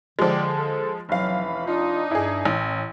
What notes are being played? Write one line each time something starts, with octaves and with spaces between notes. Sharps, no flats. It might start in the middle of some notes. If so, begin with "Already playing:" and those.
D3 F3 G#3 G4 A4 D5
A4
F1 E3 F#3 C#4 F5 B5
D4 D#4 F4
G2 E4 G#4
A1 A2